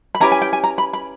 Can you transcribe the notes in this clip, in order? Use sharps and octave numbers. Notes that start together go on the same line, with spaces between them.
B5
C#4 E4 G4 B4 A#5
G#5
G5
G#5
A#5
B5
B5